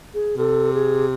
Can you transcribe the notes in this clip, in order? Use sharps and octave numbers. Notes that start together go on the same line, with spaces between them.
G#4
C3 A4
G#4